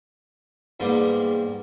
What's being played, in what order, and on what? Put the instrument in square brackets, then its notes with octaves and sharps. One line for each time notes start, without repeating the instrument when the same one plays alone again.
[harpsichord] E2 G#2 G3 A#3 G4